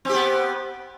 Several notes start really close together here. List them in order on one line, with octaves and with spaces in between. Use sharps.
C4 G4 B3